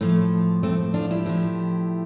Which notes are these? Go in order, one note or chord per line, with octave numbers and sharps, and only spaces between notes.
A2 F3 A3
A3 C4
D4 F4
E4 G4
A2 F3